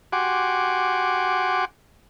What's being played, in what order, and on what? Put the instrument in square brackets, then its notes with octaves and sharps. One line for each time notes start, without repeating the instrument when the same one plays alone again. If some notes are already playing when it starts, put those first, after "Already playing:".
[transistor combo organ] F#4 G4 F#5 G#5 C6 D6